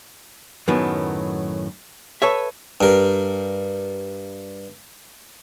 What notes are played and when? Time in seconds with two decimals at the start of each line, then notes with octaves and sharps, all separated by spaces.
0.68 F#2 A2 D#3 F#3 B3
2.22 A4 B4 C#5 E5
2.81 G2 A#4